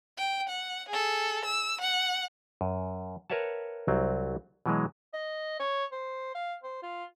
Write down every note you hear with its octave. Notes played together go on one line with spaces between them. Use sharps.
G5
F#5
G#4 A4
E6
F#5
F#2
A#4 B4 C#5 E5 F#5 A5
C2 F#3 C4
B2 E3 F#3 G#3
D#5
C#5
C5
F5
C5
F4